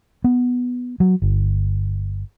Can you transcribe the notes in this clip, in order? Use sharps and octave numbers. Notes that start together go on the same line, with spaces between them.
B3
F#3
G1